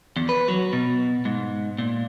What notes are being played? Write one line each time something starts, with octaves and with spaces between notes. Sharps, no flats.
E2
B4
F#3
B2
G#2
A#2